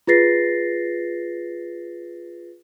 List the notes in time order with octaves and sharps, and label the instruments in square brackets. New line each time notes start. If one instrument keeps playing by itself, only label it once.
[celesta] F4 G#4 B4 A6 A#6 C7